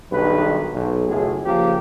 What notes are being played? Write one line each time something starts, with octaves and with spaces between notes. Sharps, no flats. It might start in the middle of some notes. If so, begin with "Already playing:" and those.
B1 G2 D#3 B4
B1
C#2 F#2 A2 G#4
C#3 F3 A#3 G4